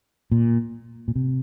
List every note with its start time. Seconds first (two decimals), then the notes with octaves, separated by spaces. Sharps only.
0.32 A#2
1.08 A#2
1.16 C3